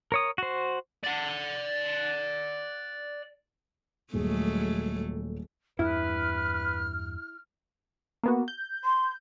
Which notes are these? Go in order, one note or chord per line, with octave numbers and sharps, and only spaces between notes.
A#4 C#5 D#6
F#4 C5
D5 F#5
D#1 F#3 G#3 A3 G#4
E2 G2 E4 B4 F6
A#3 B3 F#4
G6
C6